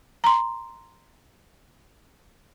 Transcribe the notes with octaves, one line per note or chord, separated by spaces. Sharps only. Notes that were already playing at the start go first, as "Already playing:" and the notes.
A#5 C6